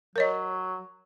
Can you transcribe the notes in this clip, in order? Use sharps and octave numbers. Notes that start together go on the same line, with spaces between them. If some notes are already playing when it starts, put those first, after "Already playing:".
F#3 A#4 C#5 D#5